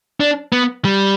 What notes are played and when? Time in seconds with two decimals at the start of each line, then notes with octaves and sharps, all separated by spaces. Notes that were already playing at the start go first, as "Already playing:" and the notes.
0.20 D4
0.52 B3
0.85 G3